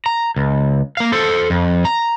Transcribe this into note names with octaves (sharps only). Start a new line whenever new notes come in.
A#5
C#2
A#3 F5
A4 C5
F2
A#5